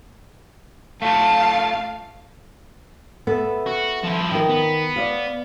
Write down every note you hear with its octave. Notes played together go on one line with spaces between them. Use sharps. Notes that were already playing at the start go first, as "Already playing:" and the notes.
A3 F4 F5 A5
B3 A4 E5
F#4
F3 E4
D#3 A#4
B3
D5 F5